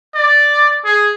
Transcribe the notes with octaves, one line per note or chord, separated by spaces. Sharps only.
D5
G#4